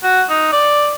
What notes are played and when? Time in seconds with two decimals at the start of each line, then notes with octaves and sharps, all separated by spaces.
0.03 F#4
0.30 D#4
0.52 D5